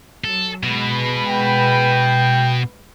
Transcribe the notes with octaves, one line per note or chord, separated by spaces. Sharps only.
F#3 A4
B2 G#3 B4
G5